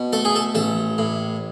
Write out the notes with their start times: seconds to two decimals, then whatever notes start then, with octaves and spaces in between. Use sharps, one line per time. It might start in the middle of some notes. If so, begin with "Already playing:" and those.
Already playing: B2
0.13 A3 A4
0.25 G#4
0.36 A4
0.55 A1 A4
0.98 A2